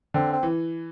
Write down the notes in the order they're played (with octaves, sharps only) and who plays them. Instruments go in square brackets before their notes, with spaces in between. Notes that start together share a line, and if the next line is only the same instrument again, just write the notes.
[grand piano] D3 [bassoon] C4
[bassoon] C4
[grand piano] E3